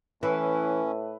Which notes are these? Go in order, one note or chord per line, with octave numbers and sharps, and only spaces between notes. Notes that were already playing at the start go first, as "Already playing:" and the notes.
A2 E3 C#4 B4